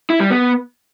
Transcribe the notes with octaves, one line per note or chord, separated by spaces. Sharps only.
E4
G3
B3